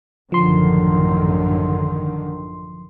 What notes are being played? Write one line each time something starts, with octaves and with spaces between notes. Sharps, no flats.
A1 F#2 D3 D#3 F3 C6